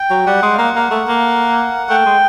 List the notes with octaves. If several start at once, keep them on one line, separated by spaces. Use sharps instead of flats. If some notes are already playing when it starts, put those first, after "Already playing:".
Already playing: G5
F#3
G3 F#5
G#3
F5
A#3 F#5
A#3
A3
A#3
A3 G5
G#3